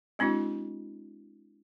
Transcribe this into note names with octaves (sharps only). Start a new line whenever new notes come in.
G#3 C4 D4 E4 F#4